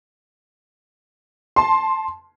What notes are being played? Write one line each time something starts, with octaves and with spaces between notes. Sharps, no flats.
A5 C6